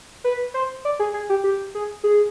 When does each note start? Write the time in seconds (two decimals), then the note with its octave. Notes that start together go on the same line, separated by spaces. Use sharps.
0.24 B4
0.54 C5
0.85 D5
0.99 G#4
1.14 G#4
1.30 G4
1.44 G4
1.75 G#4
2.04 G#4